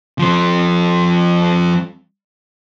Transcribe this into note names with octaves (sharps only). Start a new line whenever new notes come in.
F3 C4